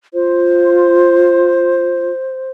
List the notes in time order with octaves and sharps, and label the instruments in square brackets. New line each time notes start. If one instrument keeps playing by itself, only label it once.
[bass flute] F4 [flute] C5